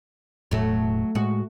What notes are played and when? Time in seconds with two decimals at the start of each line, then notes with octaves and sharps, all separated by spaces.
0.51 E1 A2 F#3 A3
1.15 A2 G#3 F#4